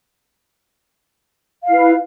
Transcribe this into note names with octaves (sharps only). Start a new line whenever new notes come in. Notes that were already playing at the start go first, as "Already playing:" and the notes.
E4 B4 F5